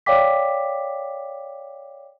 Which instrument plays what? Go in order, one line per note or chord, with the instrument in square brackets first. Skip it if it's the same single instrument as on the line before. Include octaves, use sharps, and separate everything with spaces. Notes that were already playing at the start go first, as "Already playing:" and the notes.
[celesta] C#5 D5 F5 G5 D6 B6